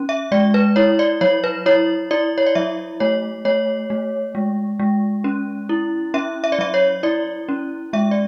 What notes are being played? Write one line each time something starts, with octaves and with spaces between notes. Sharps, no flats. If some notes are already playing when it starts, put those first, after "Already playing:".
Already playing: C#4
E5
G#3 D5
B4
E4 C#5
D5
F#3 C#5
B4
E4 C#5
E4 D5
C#5
D5
F#3 E5
A3 C#5
A3 C#5
A3
G#3
G#3
C#4
E4
C#4 E5
E5
D5
F#3 E5
C#5
E4 D5
C#4
G#3 E5
D5